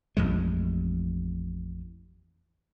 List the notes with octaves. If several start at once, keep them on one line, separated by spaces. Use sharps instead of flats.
A1 F2 G#3